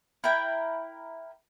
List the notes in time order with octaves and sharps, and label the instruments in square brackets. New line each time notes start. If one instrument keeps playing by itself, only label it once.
[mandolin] E4 A#4 G5